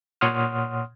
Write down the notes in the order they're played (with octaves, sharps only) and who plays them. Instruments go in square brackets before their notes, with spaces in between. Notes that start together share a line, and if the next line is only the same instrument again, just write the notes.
[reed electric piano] A#2 C#5 F#5 C6 D#6 F6